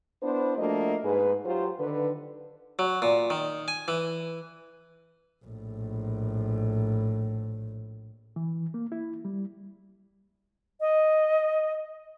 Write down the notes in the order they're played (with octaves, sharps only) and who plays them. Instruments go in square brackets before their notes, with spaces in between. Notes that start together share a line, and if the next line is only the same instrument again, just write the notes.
[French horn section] B3 D4 E4 B4 C5
F3 A3 A#3 D4 F#4 D#5
G#2 G#4 B4
F#3 F4 G4 C5
D3 D#3 B4
[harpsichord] F#3
A#2
D#3
G#5
E3
[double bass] A#1 A2
[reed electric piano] E3
A#3
E4
G3
[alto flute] D#5